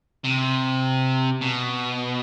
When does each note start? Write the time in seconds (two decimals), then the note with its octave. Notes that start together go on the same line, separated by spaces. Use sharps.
0.25 C3
1.41 B2